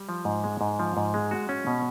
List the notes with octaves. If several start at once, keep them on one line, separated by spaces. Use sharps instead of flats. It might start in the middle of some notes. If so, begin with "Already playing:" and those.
Already playing: G3
F3
G#2
G#3
G#2
F3
G#2
G#3
F#4
C#4
B2